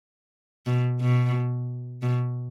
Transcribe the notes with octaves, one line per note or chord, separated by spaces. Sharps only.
B2
B2
B2